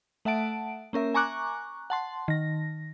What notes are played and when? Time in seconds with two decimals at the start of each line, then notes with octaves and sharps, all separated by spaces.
0.25 A3 E5 F#5 A5 D7
0.93 A#3 C#4 A#4 E5
1.14 G#5 A#5 C#6 D6 F#6
1.90 F#5 A5 C6
2.28 D#3 A#6